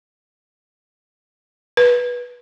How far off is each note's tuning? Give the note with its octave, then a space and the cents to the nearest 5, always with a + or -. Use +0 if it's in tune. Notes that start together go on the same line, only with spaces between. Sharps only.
B4 -15